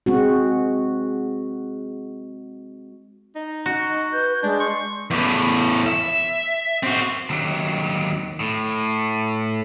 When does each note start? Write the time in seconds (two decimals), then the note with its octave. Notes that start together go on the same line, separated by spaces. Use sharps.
0.06 G#3 C4 F#4
3.36 D#4
3.66 F#4
4.13 B4 G6
4.43 G#3 D4
4.60 C6 C#6
5.11 E2 A2
5.86 E5
6.83 C4 F#4
7.30 D#2 F#3
8.40 A2